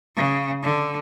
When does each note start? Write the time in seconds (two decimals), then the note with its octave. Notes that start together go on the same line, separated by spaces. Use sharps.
0.16 C#3
0.63 D3